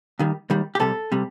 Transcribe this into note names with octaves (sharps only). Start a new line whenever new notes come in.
D#2 D#3 G3
D#2 D#3 G3
G4
C2 C3 G3 A4
C3 G3